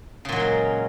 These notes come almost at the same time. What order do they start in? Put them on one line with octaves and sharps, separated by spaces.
C#3 A#2 F#3 G#3 C#4